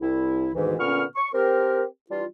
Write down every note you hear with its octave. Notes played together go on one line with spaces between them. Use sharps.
C2 E4
D2 G#2 B2 D#3 E3
A#2 D3 B3 C#4 C#6 F6
C#6
C4 G4 A#4
E3 G3 D4 F4